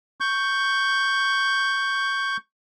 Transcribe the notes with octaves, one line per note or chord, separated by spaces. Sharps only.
C#6 G6